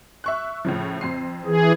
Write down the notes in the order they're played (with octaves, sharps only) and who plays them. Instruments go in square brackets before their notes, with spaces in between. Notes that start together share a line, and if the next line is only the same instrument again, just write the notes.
[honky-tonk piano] E5 C#6 F#6
A2 C#3 F3
F2 C4 C7
[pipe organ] E3 G#4